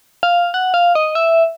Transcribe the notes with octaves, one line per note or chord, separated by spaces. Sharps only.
F5
F#5
F5
D#5
E5